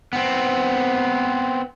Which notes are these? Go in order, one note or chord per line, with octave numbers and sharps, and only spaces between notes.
B3 C4